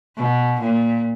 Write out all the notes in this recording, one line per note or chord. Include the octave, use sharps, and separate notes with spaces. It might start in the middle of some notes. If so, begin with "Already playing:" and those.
B2
A#2